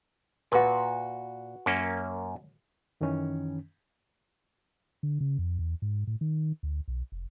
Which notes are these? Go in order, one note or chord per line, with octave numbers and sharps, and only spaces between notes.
A#2 F#4 B4
F#2 A#3 C#4
F#2 D#3 E3 C#4
D3
C#3
F2
E2
G#2
A2
D#3
D2
B1
F1